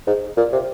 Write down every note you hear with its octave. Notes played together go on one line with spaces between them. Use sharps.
G#2
A#2
C3